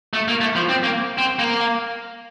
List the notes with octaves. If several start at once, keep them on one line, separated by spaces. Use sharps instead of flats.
A3
A#3
A3
F3
C4
A#3
C4
A#3